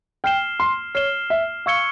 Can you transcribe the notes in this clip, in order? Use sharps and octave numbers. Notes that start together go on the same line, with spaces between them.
G5 F6 C7 E7 G7
C6
C#5 F6 C7 E7 G7
E5
F5 C#6 E6 G#6 C#7 G7